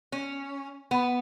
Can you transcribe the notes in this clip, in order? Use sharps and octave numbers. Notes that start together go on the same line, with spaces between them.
C#4
B3